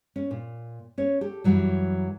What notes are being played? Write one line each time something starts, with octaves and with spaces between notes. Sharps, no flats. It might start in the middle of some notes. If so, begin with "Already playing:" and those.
C#4
A#2
C#4 C#5
G4 A4
F#2 A2 E3 F#3 G3